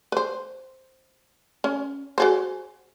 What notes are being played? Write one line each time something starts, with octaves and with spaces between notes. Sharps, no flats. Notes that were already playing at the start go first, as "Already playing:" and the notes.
B4 C5
C#4
F#4 G#4 C5